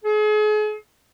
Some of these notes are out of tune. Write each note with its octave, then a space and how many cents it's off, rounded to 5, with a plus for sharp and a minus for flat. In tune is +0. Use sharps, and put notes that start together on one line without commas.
G#4 +40